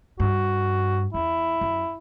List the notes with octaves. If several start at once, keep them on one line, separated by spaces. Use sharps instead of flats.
G2 F#4
E2 E4
F#2